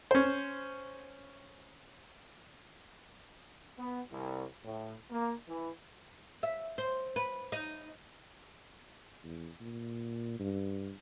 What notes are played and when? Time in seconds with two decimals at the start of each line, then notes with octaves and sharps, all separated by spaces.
0.11 C#4 C5
3.79 B3
4.12 C2
4.64 A2
5.11 A#3
5.48 E3
6.43 E5
6.78 C5
7.16 B4
7.52 D#4
9.24 E2
9.61 A#2
10.39 G2